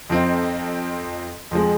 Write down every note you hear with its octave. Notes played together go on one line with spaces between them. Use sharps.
F2 F3 C4 D#4
F2 F3 G#3